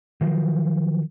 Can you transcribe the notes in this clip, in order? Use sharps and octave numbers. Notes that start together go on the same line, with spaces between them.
D#3 F3 F#3